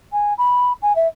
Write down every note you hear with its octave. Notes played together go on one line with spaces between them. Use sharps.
G#5
B5
G#5
E5